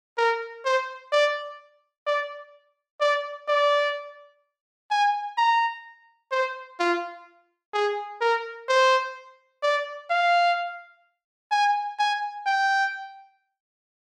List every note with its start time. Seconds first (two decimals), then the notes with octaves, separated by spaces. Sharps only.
0.18 A#4
0.65 C5
1.12 D5
2.07 D5
3.01 D5
3.48 D5
4.90 G#5
5.38 A#5
6.32 C5
6.79 F4
7.73 G#4
8.21 A#4
8.68 C5
9.63 D5
10.10 F5
11.51 G#5
11.99 G#5
12.46 G5